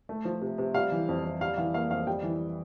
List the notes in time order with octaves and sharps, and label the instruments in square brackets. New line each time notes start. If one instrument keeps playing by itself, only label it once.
[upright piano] A3
F3
C3
C3
G3 F5
E3
F2
F2
G3 F5
E3 F5
A#3 F5
F2 F5
G3 G5
E3